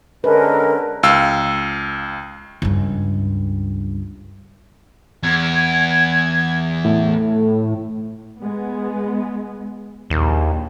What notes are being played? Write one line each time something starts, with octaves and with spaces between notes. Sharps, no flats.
D3 G#3 C#4 A#4 B4
C#2 F5 E6
C#2 G2
E2 G#6
A2
G#3 B3
A#1 D#2